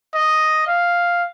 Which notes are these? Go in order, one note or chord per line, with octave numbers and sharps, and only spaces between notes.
D#5
F5